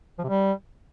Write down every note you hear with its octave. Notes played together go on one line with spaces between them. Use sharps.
F3
C3
G3